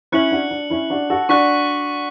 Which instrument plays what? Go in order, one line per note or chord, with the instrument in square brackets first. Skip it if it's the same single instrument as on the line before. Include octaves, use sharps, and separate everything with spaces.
[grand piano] C#4 E4 [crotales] F#6 C#7 F#7
[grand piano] D4 F#4
D4
C#4 E4
D4 F#4
F#4 A4
[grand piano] D4 F#4 [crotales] C#6 F#6 B6